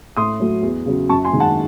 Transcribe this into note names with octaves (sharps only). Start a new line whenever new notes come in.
A2 C6 D#6
F#3 A3
E2
C#3 F#3
F#2 A5 C#6
G#5 C6
D#3 G#3
F#5 A5